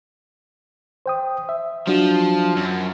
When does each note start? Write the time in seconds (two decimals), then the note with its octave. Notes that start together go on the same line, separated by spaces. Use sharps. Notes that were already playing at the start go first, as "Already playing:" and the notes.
1.06 C5 G5 D#6
1.49 E5
1.87 F3 F#3 D4 F#4
2.57 F#2